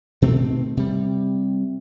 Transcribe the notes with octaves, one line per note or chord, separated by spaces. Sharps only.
B2 D#3 A3 C4
C3 G3